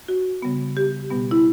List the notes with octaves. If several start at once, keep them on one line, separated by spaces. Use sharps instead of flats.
F#4
C#3 G3 B3
G4
B2 G3 B3
E4